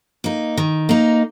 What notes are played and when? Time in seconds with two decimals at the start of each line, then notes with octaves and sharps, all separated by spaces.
0.24 A#3 D#4
0.57 D#3
0.89 A#3 D#4